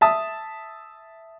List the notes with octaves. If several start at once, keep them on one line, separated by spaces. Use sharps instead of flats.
E5 A5 D#6